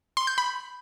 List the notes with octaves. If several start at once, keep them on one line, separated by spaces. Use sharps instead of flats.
C6
G6
B5